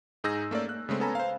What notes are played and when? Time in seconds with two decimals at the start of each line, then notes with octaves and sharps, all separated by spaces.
0.24 G#2 D#4 G#4 E6 G6 A#6
0.51 A3 A#3 C#4 D5
0.69 F#6
0.89 C#3 G#3 A3 C4
1.00 B3 C#4 A4 G#5 A#5 B5
1.15 C5 F5